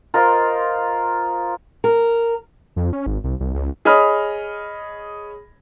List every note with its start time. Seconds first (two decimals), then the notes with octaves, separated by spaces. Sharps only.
0.14 F4 A#4 C5 D#5
1.84 A#4
2.76 F2
2.93 C#4
3.06 G#1
3.24 C2
3.40 C2
3.54 C#2
3.85 G#4 C#5 D#5 B5 D#6 F6